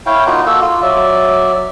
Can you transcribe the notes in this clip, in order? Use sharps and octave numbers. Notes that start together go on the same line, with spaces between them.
E4 C#5 F5 G5
A#3 D#4 F4 F#4
A#3 F#4 A4 E6
F4
F#3 D5 E5